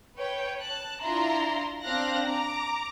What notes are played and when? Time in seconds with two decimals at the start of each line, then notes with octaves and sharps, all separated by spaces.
0.15 B4 C#5 G5
0.61 A5 F#6
1.02 D4 E4 F4 A#5 C6
1.83 C4 D4 F5 F#6 A#6
2.25 A#5 D6